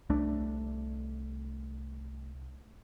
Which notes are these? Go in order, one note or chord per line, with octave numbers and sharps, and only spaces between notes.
C2 A3 D4